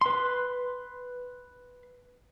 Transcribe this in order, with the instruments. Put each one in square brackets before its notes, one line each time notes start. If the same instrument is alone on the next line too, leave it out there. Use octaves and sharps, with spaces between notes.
[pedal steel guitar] B4 C6